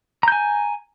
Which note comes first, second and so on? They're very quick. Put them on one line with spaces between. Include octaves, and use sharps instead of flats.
A#5 G6 G#5